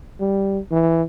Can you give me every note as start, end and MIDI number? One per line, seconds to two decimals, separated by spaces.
0.20 0.59 55
0.71 1.03 52